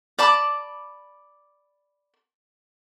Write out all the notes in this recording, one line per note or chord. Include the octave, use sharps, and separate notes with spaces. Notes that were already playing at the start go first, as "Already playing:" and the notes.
D5 A5 B5 D6